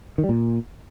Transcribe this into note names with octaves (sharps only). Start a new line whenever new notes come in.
D#3
G3
A#2